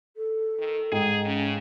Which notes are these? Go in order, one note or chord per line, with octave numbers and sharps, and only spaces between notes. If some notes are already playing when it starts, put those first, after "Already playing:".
A4
D#3
G#2 G#4 G5
C#3 C#4